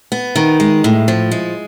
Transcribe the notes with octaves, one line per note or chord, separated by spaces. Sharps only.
B3
D#3
G#3
A2
F3
G#3